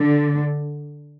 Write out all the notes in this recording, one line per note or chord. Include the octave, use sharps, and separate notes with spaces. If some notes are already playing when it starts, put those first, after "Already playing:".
Already playing: D3